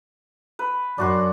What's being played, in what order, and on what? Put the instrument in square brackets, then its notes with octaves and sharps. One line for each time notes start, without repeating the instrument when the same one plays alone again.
[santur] B4
[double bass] F#2 [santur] D4 F#4 C6